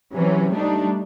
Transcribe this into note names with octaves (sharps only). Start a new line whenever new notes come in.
C3 E3 F#3 C#4
G3 A3 D4 D#4